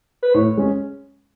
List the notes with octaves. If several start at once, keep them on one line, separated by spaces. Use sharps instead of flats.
B4
A2 C#5
G#3 C#4